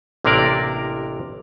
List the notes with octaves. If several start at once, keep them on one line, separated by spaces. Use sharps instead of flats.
A1 C3 A#3 D4 A#4 D5